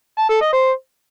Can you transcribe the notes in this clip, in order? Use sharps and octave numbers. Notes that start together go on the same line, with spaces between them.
A5
A4
D#5
C5